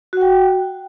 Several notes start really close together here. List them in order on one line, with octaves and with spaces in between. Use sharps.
F#4 F#5 G5